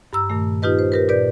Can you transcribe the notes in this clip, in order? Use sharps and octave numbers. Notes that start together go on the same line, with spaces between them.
G2 A#5 E6
G2 A#2 D#3 A3
D#4 F4 G4 B4 D#5
C5
G4 A#4 B4
A#2 B4 D5 G6